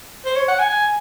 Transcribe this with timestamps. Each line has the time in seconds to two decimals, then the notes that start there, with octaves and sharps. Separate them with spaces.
0.25 C5
0.36 C#5
0.48 F#5
0.59 G#5
0.70 G#5